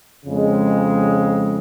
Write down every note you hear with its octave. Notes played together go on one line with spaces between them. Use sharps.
F2 C#3 G#3